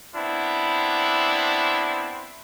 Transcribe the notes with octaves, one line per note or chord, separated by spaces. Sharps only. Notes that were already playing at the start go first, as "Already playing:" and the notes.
B3 C4 D4 E4